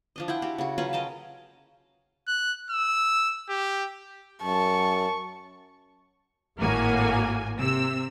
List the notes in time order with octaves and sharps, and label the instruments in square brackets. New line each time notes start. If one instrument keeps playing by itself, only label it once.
[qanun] F3 D4 D#5
E4 F4 F#5 G5
F#4 G4
C#3 F#4
F#3 C#4 F4 B4
A#4 D#5 G5 A5
[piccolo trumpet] F#6
E6
G4
[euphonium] F#2 [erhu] A5 [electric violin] C#6
[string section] G#1 A2 A#3 F#4 G#5
C3 E6